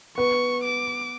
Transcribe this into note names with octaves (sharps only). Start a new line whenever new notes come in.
B3 C#6
D6